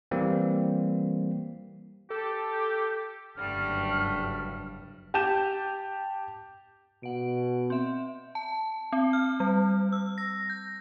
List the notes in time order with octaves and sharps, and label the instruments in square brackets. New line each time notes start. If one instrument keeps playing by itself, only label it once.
[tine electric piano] E3 G3 A#3 C4
[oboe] G4 [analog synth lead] A4
[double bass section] F#1 G2 [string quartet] D3 G3 A3 [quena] F6
[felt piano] G4 A5 G6 E7
[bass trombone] B2 [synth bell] F#5 D7
[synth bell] C4 E5
A5
C4
F6
G3
E6
A#6
G6